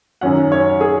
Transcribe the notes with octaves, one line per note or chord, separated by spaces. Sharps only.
F#2 D#3 F#3 C#4 F#5
C#5
G#4